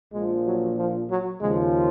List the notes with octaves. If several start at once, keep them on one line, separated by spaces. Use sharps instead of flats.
A#1 A#2 F3 G#3
F#3
F3
F#3
D#2 C#3 F3 G#3